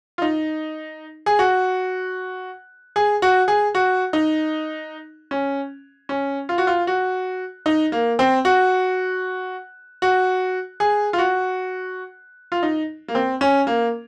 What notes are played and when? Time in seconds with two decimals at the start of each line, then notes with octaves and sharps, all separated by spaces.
0.18 F4
0.22 D#4
1.26 G#4
1.39 F#4
2.96 G#4
3.22 F#4
3.48 G#4
3.75 F#4
4.13 D#4
5.31 C#4
6.09 C#4
6.49 F4
6.58 F#4
6.67 F4
6.87 F#4
7.66 D#4
7.92 A#3
8.19 C4
8.45 F#4
10.02 F#4
10.80 G#4
11.13 F4
11.18 F#4
12.52 F4
12.63 D#4
13.08 A#3
13.15 C4
13.41 C#4
13.67 A#3